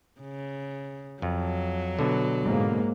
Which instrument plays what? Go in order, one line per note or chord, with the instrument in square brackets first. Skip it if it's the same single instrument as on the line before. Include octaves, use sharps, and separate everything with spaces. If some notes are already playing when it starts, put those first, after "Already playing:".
[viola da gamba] C#3
[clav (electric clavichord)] F2 [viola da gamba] F#3
[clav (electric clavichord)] B2 D3
[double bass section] G#2 A#3